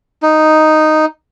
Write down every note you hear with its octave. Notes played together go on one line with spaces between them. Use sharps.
D#4